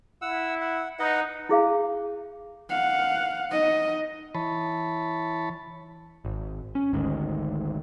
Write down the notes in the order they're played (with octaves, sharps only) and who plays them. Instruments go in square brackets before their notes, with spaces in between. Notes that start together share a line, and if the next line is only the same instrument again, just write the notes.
[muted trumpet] E4 [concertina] F#5 E6
[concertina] F#5
[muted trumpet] D#4 [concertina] B4 D#5 F#5
[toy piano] E4 G#4 F5
[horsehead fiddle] F5 F#5
D#4 D#5
[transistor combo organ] E3 C#5 A5 B5
[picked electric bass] G#1
C#4
G#1 D2 G#2 D#3